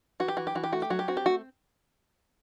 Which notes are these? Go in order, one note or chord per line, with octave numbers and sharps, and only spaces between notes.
E3 F#4
G4
E3 F#4
G4
E3 F#4
G4
A3 F#4
G4
F#3 F#4
G4
C4 F#4
G4
A3 F#4